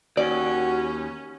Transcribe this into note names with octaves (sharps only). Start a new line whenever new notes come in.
D#2 C#4 F#4 D5